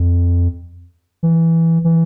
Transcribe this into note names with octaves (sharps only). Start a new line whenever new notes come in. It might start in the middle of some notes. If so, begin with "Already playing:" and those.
Already playing: F2
E3
E3